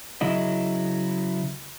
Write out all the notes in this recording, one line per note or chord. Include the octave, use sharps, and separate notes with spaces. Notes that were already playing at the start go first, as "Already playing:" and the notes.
C#3 F#3 E4 D#5